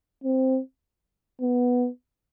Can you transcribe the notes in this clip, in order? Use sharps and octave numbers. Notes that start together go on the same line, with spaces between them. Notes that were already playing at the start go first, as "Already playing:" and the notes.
C4
B3